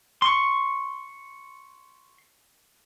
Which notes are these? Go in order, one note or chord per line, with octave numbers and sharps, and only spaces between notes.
C6 C#6